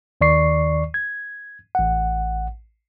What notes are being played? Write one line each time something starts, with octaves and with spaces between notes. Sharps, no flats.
D#2 D#3 D5 C#6 C7
G#6
A1 F#5